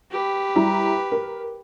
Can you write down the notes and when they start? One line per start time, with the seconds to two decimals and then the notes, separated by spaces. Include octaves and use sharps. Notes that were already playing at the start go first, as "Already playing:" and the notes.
0.11 G4 B4
0.55 G3 E4 A#5
1.12 A#4